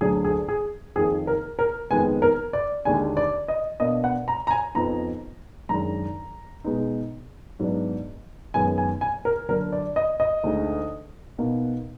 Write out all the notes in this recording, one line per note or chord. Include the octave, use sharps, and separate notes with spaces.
D2 D3 F#3 G#4
G#4
G#4
F2 D#3 A#3 G#4
A#4
A#4
F2 D#3 G#3 B3 G#5
A#4
D5
D#2 D3 G#3 D4 G#5
D5
D#5
B2 A#3 D4 D#5
F#5
A#5
A#5
G#5
F2 F3 B3 D#4 A#5
F#2 D#3 G#3 D4 A#5
B2 G#3 B3 D#4
G#2 F#3 B3 D4
F#2 D#3 G#3 B3 G#5
G#5
G#5
A#4
D3 F#3 D4 A#4
D5
D#5
D#5
D2 D3 G#3 D#4
B2 A#3 D#4